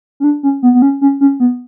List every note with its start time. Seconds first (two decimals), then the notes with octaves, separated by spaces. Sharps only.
0.20 C#4
0.24 D4
0.43 C#4
0.63 B3
0.74 B3
0.82 C#4
1.01 C#4
1.21 C#4
1.40 B3